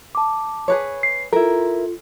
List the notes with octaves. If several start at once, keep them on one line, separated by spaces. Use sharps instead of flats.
A5 D6
G#4 B4 C#5
C7
E4 F4 A4 A#4